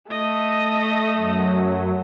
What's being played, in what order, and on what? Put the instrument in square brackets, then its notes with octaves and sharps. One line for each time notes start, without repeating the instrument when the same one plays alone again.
[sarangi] A3 [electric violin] D#5
[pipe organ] F#2 F#3